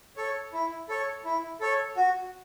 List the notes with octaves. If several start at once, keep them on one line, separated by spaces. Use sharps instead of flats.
A4 C#5
E4
A4 C#5
E4
A4 C#5
F#4